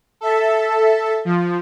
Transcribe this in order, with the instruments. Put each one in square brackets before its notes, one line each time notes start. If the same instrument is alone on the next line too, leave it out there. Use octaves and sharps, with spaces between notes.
[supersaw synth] A4 E5 A5
F3